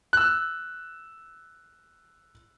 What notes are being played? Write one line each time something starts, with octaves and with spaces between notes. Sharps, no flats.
E6 F#6